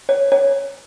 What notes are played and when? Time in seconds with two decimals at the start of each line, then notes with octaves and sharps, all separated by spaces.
0.09 C#5
0.32 C#5